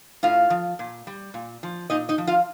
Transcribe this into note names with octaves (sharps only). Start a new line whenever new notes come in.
A2 F4 F5
F3
A#2
G3
A#2
F3
A#2 D#4 D#5
D#4 D#5
F3
F4 F5